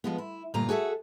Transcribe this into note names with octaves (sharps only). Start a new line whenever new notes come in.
F3 G#3 B3
E4
D2 G2 A#2 F4 A#5
F#4 G#4 A4 E5